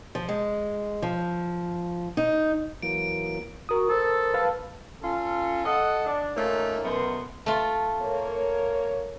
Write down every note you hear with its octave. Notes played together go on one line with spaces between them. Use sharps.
F3
G#3
F3
D#4
E3 F#3 A#3 D7
F#4 A#4 D#6
A4 C5
B4 F5 A5
C#4 F4 A4
A4 D#5 F#5
D4
A3 A#3 C#4 D#4 F4
F#2 B2 A3 B3 A#4 C6
A3 F4
A#3 A#4 C#5